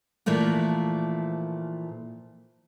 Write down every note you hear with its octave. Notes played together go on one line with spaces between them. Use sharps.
A#2 E3 F3 A3 A#3